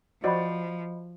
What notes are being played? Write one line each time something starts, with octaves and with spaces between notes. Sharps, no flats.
F3 F#4 C5 D5 D#5 B5